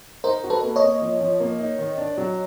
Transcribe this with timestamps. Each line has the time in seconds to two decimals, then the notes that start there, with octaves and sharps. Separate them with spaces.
0.24 D#4 A#4 C5
0.44 F#4
0.50 A4 B4
0.63 A#3
0.76 C#5 D#5
0.83 A#3
1.02 F3
1.21 F3
1.40 A#3
1.60 D#4
1.79 D#3
1.98 D4
2.18 F#3